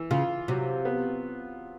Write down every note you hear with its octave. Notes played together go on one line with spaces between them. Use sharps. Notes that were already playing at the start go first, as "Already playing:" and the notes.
Already playing: E3
C#3 F4
C3 F#3
B3